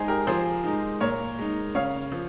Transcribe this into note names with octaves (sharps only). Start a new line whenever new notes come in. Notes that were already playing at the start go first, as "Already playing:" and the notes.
Already playing: G#3 D#4 G#4 C5
G4 A#4
F3 G#4 C5
G#3 D#4
A#2 A#4 C#5
G#3 D#4
C#3 C#5 F5
F3